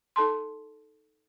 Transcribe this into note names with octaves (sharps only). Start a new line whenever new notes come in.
D#4 A4 A5 C6